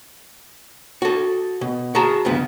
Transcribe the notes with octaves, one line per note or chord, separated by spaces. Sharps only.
F#4 A4
B2
F#4 G#4 A5 A#5
D2 G2 C#3 F3 B3